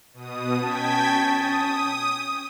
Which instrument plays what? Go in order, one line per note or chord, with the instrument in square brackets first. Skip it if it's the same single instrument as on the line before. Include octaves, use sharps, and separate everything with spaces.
[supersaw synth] B2 D#6
[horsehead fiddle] C#4 [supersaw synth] G5 G#6 B6 [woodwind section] A5
[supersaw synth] D#6